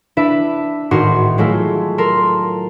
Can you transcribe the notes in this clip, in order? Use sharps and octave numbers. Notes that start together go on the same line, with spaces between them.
D4 E4 B4 E5
G#1 A2 D#3 D#4 F#4 C6
F#3 G#3 A3 E4 F4
A4 A#4 C6